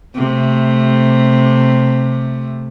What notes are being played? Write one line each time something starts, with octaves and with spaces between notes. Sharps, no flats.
C3 A3